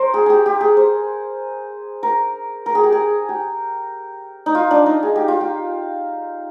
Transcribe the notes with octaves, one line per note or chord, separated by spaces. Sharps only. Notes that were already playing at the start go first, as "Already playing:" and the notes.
Already playing: A#4 C5
G#4
G4 G#4
G4
G#4
C5
A#4
A#4
G#4
G4
G#4
G4
D#4
F4
D4
D#4
G#4
G4
F4
G4